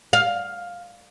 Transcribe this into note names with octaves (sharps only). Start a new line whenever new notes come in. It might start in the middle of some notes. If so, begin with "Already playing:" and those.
F5